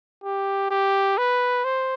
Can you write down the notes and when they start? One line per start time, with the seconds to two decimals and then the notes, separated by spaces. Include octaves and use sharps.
0.24 G4
0.70 G4
1.18 B4
1.64 C5